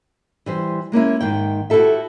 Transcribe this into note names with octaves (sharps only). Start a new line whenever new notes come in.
E3 G3 C5
G#3 A#3 C#4 E4
G#2 D#3 G5
E4 F#4 G4 A4 E5